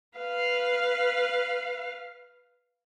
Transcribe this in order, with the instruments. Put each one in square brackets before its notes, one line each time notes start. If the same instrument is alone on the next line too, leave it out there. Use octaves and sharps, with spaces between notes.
[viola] B4 F5